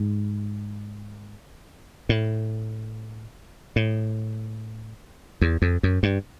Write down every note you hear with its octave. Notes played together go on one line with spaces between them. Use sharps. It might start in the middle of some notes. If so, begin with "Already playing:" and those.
Already playing: G#2
A2
A2
E2
F2
F#2
G2